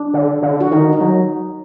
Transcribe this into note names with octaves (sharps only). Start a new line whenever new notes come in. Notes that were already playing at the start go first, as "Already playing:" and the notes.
Already playing: D4
D3
D3
F#4
D#3 D#4
D#4
F#3